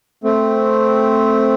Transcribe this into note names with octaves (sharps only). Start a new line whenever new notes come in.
A3 C4